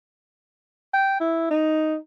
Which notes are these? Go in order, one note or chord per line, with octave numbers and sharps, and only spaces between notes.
G5
E4
D#4